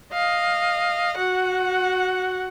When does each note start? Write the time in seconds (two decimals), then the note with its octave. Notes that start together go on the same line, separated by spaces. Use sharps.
0.13 D#5 F5
1.18 F#4 F#5